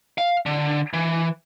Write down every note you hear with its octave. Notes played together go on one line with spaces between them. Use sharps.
F5
D3
E3